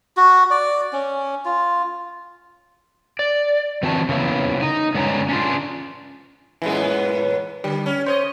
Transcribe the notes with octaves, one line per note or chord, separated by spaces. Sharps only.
F#4
D5
C#4
F4
D5
E3 C4 F#4 A5
C#3 A#3 B3 E4
D#4
D3 G#3 B3 C#4 C#5 A#5
C#4 D4 F4
F#2 A2 E3 G#3 B3
D3 G3
C#4
C5 C#5 D#5